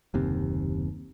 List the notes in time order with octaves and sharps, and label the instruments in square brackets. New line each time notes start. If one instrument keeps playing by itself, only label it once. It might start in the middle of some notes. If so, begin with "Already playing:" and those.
[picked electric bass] F#1 D#2 C3